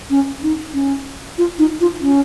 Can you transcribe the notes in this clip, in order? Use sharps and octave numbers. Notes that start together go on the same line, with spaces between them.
C#4
D#4
C#4
F4
D#4
F4
C#4